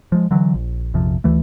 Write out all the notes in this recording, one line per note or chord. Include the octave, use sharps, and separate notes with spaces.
F3 G#3
D3 E3 F#3
A#1
A#1 F2 C3 F3
D2 E3 A3